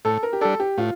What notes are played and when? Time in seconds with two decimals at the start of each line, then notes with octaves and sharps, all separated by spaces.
0.05 A2 A4
0.23 A#4
0.33 G4
0.41 G3 D4 A4
0.60 G4
0.78 A2 F4